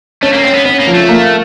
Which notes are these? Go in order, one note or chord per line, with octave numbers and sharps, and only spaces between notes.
A3 C#4
A#3
C4 C#4
B3
B3 C#4
A#3
F3
A3
A#3